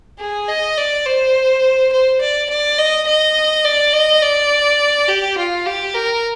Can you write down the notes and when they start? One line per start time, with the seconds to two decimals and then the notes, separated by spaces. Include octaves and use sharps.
0.19 G#4
0.48 D#5
0.78 D5
1.06 C5
1.92 C5
2.21 D5
2.50 D5
2.78 D#5
3.07 D#5
3.65 D5
3.93 D#5
4.22 D5
5.08 G4
5.38 F4
5.66 G4
5.94 A#4